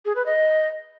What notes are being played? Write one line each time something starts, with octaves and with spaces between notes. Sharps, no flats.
G#4
B4
D#5